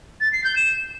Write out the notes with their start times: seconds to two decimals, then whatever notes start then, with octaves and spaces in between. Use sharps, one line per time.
0.21 A6
0.32 C7
0.44 G6
0.56 E7